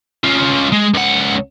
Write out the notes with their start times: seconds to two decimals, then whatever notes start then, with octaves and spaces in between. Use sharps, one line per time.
0.24 C#4 F4
0.72 G#3
0.94 C#2 F#5